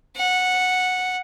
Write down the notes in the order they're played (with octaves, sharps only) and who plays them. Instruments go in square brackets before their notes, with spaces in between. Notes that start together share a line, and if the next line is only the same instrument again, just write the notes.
[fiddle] F#5